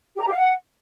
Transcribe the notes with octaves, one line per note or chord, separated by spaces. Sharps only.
G4
A#5
G4
F5
F#5